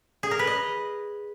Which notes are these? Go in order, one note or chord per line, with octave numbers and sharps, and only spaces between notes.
G#4
A#4
B4
D#5